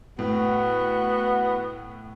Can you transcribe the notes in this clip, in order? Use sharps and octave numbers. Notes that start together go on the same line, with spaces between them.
A2 B3 F#4